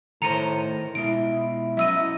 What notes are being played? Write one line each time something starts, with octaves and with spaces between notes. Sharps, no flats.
A2 D#3 A#4 C5 A#5 C#7 D#7
B2 G#3 E4 F4 D7
F#3 C#4 D#5 E5 E6 D#7